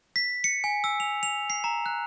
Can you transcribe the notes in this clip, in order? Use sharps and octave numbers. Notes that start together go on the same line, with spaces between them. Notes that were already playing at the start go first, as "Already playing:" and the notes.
B6
C#7
G#5
E6
F7
F7
C7
A#5
F#6